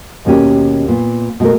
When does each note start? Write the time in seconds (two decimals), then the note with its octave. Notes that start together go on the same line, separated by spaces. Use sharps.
0.25 D#2 B2 A#3 C#4 G4
0.88 A#2 B3
1.40 B2 G#3 A3 A#4